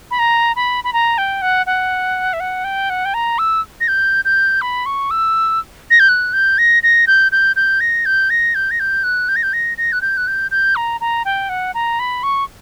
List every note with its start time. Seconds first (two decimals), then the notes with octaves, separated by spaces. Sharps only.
0.11 B5
0.19 A#5
0.56 B5
0.84 B5
0.93 A#5
1.18 G5
1.42 F#5
1.66 F#5
2.33 E5
2.40 F#5
2.64 G5
2.90 F#5
3.05 G5
3.14 A#5
3.39 E6
3.80 A#6
3.88 G6
4.25 G6
4.61 B5
4.86 C#6
5.11 E6
5.90 A#6
6.00 G6
6.09 F#6
6.33 G6
6.58 A#6
6.83 A#6
7.07 G6
7.32 G6
7.56 G6
7.80 A#6
8.06 G6
8.30 A#6
8.55 G6
8.71 A#6
8.80 G6
9.04 F#6
9.28 G6
9.36 A#6
9.43 G6
9.53 A#6
9.78 A#6
9.92 F#6
10.02 G6
10.17 F#6
10.27 G6
10.51 G6
10.76 A#5
11.01 A#5
11.25 G5
11.49 F#5
11.74 A#5
11.99 B5
12.23 C#6